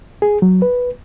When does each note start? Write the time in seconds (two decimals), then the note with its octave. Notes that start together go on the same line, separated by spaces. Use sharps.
0.22 G#4
0.42 F#3
0.62 B4